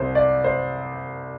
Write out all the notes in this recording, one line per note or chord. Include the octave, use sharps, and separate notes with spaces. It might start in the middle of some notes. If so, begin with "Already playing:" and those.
Already playing: C2 C3 C5
D5
C5